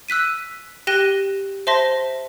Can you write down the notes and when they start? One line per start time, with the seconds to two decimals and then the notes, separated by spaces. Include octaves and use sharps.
0.08 E6 F#6 B6 D#7
0.87 G4 G5 F#6 A#6 D#7 G7
1.67 C5 E5 A5 C6 A#6 B6